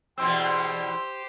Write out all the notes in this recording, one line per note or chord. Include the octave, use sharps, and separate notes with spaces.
E2 B2 C4 G4 C5 C6 E6